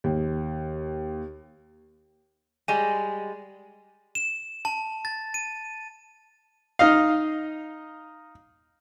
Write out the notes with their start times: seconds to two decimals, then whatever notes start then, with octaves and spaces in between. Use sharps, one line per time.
0.04 D#2
2.68 G3 G#3 G#5
4.15 E7
4.65 A5
5.05 A6
5.34 D#7
6.79 D#4 D#5 F5